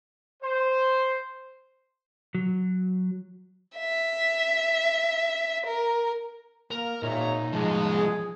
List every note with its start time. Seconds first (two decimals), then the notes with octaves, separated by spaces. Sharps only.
0.42 C5
2.35 F#3
3.77 E5
5.66 A#4
6.71 A#3 A#4
7.03 G#1 A#2 D#4 C#5 E5 A#5
7.52 C2 F3 G#3 A5
7.95 G#4